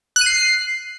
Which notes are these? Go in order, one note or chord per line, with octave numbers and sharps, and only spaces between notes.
F#6
D#7
C7